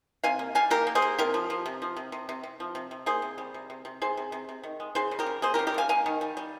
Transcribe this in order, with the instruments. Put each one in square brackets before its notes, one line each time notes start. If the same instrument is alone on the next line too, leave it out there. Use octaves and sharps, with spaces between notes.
[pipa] C3 F5 G#5
A#3
G3 F5 G#5
A#3 G4 A#4
A#3
G#4 C5
A#3
C3 G4 A#4
F3
F3
C3
F3
C3
C3
C3
C3
F3
C3
C3
A#3 G#4 C5
C3
G3
C3
C3
C3
C3 G#4 C5
C3
C3
C3
D#3
G#3
C#3 G#4 C5
C#3
G4 A#4
C#3
A#3 G#4 C5
G4 A#4
C#3
G4 A#4
G3 F5 G#5
A#3 F5 G#5
D#3
G3
G3